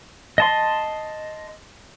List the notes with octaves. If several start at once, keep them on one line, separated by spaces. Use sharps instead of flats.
D#5 A5 C6